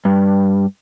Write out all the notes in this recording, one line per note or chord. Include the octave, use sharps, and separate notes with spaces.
G2